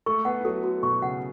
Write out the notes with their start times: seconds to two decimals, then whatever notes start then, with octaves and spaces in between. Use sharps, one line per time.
0.06 A3 A4 C#6
0.25 B3 B4 F#5
0.40 E4
0.45 F#3 F#4 A4
0.64 F#4
0.83 B2 B3 C#6
1.02 C#3 C#4 F#5